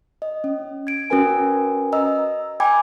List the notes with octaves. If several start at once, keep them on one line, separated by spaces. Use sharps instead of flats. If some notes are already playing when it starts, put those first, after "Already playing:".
D#5
C#4
G#6 D7
C#4 F#4 A#4 B4 G#5
D#5 A#5 E6
G5 G#5 B5 D6 G#6